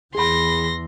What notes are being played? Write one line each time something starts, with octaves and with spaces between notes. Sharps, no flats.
E2 E3 G#4 B5 C6 A#6